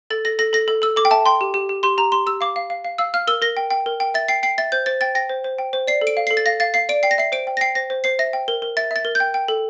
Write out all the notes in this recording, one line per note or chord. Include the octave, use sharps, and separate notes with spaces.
A4 A6
A4 A#6
A4 A#6
A4 A#6
A4
A4 E6
A4 D6
G5
E5 A5
G5 C6
G4
G4
G4
G4 C6
G4 A#5
G4 C6
G4 E6
F5 D6
F5
F5
F5
F5 E6
F5 F6
A#4 E6
A#4 A#6
G5
G5
A#4
G5
E5 A6
G5 C7
G5 C7
E5 A6
C5 G6
C5 A6
G5 A6
G5 A#6
C5
C5
G5
C5
D5 C7
A4
D7
F5
A4 C7
A6
F5 A#6
F5 A6
F5 C7
D5 D7
G5 C7
A#6
E5 C7
C5 D7
G5
A#6
G5 C7
C5 A#6
C5
C5 C7
E5 A#6
G5
A#4
A#4
E5 A6
E5 A6
A#4
G6
G5
G5
A4